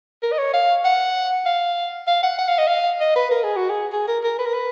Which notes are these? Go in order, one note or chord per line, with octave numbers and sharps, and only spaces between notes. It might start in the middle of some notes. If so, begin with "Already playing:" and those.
A#4
D#5
C#5
F5
F#5
F5
F5
F#5
F#5
F5
D#5
F5
D#5
B4
A#4
G#4
F#4
G#4
G#4
A#4
A#4
B4
A#4
B4